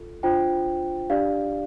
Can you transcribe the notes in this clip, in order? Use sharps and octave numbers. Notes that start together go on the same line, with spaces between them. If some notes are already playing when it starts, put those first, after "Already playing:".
Already playing: F4 A4
D4 F4 C5 G5
D4 G4 D5 F5